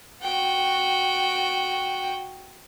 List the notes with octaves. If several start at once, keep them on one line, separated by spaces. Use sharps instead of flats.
F#4 G5